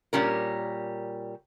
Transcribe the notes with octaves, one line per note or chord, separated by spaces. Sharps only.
A#2 G3 C#4 A#4